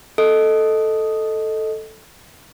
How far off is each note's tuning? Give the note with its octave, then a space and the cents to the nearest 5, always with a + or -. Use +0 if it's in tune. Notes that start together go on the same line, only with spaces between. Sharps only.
A4 +0 D#5 +0